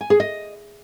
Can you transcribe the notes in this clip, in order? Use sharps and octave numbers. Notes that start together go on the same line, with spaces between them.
G#5
G#4
D#5